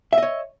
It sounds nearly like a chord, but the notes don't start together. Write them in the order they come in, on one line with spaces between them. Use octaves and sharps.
E5 D#5 C#5